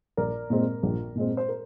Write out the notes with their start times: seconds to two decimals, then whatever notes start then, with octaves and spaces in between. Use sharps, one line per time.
0.17 A#1 A#4 D5
0.50 A#2 G#3 C4
0.83 A#1
1.15 A#2 G#3 C4
1.37 C5
1.49 A#4